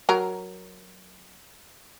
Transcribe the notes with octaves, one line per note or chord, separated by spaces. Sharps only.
F#3 A#4 A#5